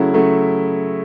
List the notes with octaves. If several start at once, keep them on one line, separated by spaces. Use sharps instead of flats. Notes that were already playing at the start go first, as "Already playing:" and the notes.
Already playing: C#3 F#3 A3 E4
C#3 F#3 A3